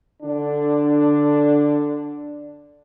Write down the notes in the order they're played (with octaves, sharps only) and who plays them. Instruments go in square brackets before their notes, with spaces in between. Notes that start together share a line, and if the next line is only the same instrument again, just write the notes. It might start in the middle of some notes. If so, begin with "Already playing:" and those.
[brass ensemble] D3 D4